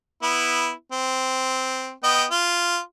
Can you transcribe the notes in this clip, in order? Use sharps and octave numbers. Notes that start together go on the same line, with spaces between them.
B3 E4
C4
B3 D#5 G5
F4